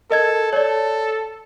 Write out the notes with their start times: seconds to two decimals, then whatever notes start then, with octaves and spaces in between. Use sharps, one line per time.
0.11 A4 A#4 D#5 G#6
0.53 A4 C#5 D5